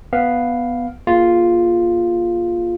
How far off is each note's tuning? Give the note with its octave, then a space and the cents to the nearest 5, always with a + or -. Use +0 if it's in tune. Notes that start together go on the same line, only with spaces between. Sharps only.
B3 +0 F5 +0
A#3 +30 F4 +0 G#4 +20